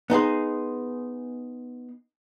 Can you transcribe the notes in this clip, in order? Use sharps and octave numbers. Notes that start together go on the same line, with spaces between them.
B3 D#4 G#4 C5